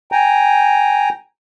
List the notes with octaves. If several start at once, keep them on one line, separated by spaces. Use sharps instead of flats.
G5 G#5 A#5